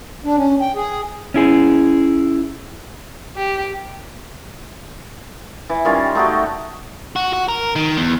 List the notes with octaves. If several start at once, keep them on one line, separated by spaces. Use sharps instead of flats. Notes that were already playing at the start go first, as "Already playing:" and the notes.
D4
C#4
G5
G#4
C#4 E4 G#4
G4
E3
D#3 G3 C#4 F4
A3 D#4 F#4 G4
F#4
F#4
A#4
D#3
E2